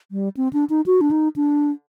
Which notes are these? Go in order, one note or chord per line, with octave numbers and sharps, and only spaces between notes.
G3
C4
D4
D#4
F#4
D4
D#4
D4